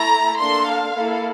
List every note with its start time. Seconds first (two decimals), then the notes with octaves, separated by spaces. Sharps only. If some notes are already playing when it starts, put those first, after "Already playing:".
Already playing: A3 E4 A4 A#5
0.40 A#3 D4 A4 C6
0.68 F5
0.96 A#3 E4 A4